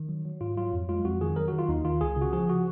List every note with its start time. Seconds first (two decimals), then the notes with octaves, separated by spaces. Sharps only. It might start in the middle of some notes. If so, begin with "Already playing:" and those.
Already playing: D#3
0.09 F#3
0.25 F#3
0.41 G#2 F4
0.57 F#3 F4
0.73 F2
0.89 G#3 F4
1.05 F2 F#4
1.21 D#3 G#4
1.36 F#3 A#4
1.48 D#3 F#4
1.59 F4
1.69 D#2 D#4
1.85 D#3 F4
2.01 C#2 G#4
2.16 C#3
2.22 F#4
2.33 F3 G#4
2.49 F#4